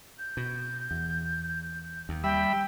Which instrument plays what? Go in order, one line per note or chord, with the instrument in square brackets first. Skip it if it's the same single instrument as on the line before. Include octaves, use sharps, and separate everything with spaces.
[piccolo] G6
[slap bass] B2
E2
D#2
[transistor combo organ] G3 E5 B5 [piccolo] G5